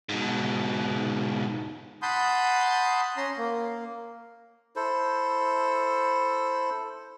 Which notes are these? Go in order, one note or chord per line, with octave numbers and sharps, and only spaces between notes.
G#2 B2
F#5 A5 B5 C6 D#6 G6
C#4 A#5 C6
A#3
E4 A4 C5